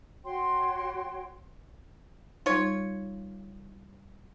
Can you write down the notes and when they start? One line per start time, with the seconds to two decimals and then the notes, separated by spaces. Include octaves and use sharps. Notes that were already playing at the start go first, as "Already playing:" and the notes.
0.24 F#4 C#5 G5 C6
2.46 G3 D#4 F4 C#5